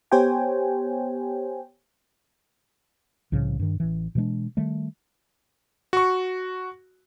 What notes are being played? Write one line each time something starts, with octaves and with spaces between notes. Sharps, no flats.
B3 G4 C5 C#5 G5 G#5
C2 A2 C#3 F3
G2 D#3
A1 E3
B2 E3 G#3 D4
D#3 G3 A3
F#4 C#6